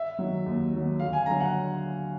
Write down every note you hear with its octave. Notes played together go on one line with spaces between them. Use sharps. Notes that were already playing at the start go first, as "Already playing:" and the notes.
Already playing: E5
D#3 F#3
D#2
D#3 F#3
D2 F5
G#5
D3 F#3 A#5
F#5